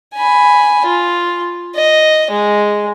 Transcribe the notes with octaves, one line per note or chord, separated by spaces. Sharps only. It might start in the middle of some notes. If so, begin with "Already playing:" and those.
G#5 B5
F4
D#5
G#3